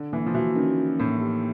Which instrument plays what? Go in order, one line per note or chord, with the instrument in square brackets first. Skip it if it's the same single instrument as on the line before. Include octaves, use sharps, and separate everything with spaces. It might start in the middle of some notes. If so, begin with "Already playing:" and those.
Already playing: [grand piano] D3
[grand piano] E3 [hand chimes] A#3
[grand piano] F3
[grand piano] E3 [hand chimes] F#4
[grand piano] D#3 [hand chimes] C#4
[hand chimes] A#3
[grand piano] A2 [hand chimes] A#3
[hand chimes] G4